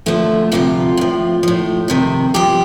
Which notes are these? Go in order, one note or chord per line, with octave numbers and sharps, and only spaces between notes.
D#2 D3 F3 A3
D2 C3 F3 F4
A2 F3
A2 F3
F2 C3 D#3
G2 F3 G4